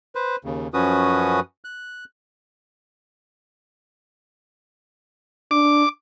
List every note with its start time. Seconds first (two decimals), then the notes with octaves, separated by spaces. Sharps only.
0.15 B4 C5
0.44 D#2 C#3
0.74 F#2 F3 C#4 F#4 B4 D#6
1.65 F#6
5.51 D4 D6